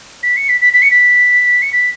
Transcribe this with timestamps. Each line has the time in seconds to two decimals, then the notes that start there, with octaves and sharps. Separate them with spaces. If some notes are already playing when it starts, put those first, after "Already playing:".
0.23 B6
0.37 C#7
0.49 B6
0.61 B6
0.73 B6
0.82 C#7
0.91 B6
1.62 C#7
1.73 B6